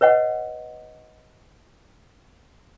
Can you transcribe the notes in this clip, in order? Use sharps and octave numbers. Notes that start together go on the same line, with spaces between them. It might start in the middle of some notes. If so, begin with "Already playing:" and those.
B4 C#5 D#5 F#5